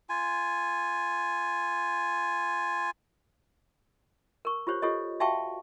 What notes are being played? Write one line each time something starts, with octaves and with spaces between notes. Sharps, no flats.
F4 G#5
A#4 C#6
F4 G4 C5 C#5
F4 G4 A4 C#5 D#5
F#4 E5 F5 G5 A5 C#6